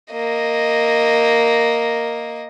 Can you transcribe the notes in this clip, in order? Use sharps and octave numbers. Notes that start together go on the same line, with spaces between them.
A#3 D#5